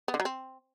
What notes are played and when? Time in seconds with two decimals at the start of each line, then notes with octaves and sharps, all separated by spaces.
0.08 B3
0.14 D3
0.20 F#3
0.25 C4